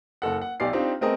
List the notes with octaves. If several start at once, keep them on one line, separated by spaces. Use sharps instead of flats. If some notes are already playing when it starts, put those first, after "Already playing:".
F#1 A4 F#5
F#5
B1 G4 D5 G#5 C7
C4 D4 D#4 F4 G4
A3 B3 C4 G#4 A#4 D#5